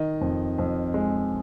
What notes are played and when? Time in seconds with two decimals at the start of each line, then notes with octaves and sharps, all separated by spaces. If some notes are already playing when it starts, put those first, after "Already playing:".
Already playing: D#3 D#5
0.21 F2
0.58 F2
0.94 G#3